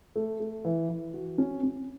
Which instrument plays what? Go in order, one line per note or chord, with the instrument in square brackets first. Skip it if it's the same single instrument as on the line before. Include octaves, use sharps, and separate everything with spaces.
[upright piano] A3
A3
E3
E3
F#4
C#4
C#4